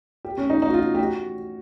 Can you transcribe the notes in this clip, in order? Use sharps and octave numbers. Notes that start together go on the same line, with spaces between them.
G4
C#4
D#4
D#4
F#4
F4
G4
F#4